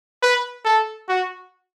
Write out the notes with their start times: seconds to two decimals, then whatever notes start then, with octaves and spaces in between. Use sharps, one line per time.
0.22 B4
0.65 A4
1.08 F#4